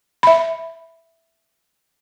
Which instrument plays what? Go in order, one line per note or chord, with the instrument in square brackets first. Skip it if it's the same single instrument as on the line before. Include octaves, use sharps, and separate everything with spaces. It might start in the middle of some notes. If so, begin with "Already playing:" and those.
[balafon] E5 B5